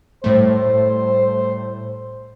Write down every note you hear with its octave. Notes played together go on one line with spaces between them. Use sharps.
A2 G3 A3 C5